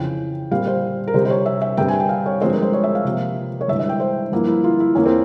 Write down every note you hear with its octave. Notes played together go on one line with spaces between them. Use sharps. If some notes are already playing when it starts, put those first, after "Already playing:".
Already playing: F2 C#3 E3 G5
A#2 G3 C4 F5
C5
A#4
C3 G3 C4 C5
C5
C#5
E5
E5
G2 G3 C4 G5
G#5
G5
F5
C#5
G2 F3 G#3 C4 C5
A#4
C5
C#5
E5
F5
C3 F3 A#3
C#5
G2 E3 G#3 E5
E5
G5
C5
G2 F3 A#3 E4
E4
F4
E4
E2 E3 A#3 C#4
C4